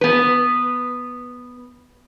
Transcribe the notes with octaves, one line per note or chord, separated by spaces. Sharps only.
B3 B4